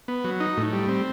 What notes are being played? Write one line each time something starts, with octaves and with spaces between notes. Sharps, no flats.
B3
F#3
D#4
A2
G3
C4